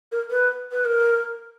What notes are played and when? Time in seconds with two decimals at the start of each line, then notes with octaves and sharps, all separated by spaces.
0.11 A#4
0.30 B4
0.71 B4
0.85 A#4